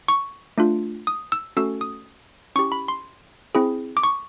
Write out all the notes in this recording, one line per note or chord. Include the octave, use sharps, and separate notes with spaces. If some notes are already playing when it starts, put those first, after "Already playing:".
C#6
A3 D4 F4
D#6
E6
A3 C#4 F#4 A4 E6
D#6
C#4 E4 G4 C#6
B5
C6
C4 E4 G#4
D6
C#6